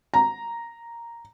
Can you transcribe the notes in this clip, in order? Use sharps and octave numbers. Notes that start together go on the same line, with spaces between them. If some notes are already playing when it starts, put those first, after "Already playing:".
A#5